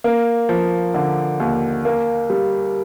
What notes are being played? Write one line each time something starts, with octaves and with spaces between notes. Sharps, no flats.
A#3
F3
D3
D#2
A#3
G3